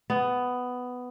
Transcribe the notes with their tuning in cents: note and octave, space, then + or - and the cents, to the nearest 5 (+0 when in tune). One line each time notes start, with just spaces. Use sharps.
B3 +10